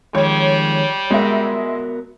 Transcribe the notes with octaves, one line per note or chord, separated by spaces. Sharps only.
D#3 F3 G3 G#3 C#5
G#3 B3 F#4 A#4 E5